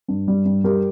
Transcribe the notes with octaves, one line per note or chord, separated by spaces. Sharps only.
G2
G3
G2
G3 G4 A#4